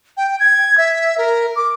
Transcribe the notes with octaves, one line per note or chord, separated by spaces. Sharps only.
G5
G#6
E5
A#4
D6